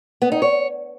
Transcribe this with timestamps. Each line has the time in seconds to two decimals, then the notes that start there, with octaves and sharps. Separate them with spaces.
0.22 B3
0.32 D#4
0.42 C#5